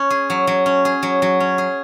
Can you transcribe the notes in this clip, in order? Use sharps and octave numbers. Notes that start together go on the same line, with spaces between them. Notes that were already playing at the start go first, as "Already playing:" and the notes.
Already playing: C#4
G#4
F#3
F#3
C#4
G#4
F#3
F#3
C#4
G#4